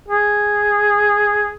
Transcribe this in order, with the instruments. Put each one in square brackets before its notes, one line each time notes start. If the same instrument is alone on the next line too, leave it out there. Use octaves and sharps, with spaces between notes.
[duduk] G#4